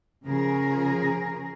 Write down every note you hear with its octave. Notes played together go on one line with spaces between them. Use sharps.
C#3 F3 G#4 A#4